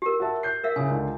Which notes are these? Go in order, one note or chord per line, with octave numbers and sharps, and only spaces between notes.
G4 A#4
F#4 E5 A5
F#6 G6 C7
A#4 E5 F5
C#3 E4 G#5
C#2 D3 F4